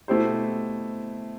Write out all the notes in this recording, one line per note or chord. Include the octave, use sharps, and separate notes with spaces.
B2 A3 E4 G4 C5